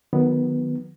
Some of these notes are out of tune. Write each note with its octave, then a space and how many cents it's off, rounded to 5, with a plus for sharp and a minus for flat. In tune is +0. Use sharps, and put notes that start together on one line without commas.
D#3 -15 F#3 -30 B3 +0